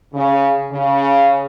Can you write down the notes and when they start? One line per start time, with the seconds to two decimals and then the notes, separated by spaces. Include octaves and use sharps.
0.14 C#3
0.72 C#3